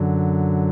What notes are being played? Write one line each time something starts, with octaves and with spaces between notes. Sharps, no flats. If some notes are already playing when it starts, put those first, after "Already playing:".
Already playing: F#2 D3 F#3